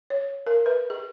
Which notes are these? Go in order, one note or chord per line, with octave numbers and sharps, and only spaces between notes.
C#5
A#4
B4
G#4